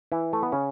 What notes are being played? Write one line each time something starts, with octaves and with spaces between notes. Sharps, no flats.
E3 E4
A3
B3
C#3 C#4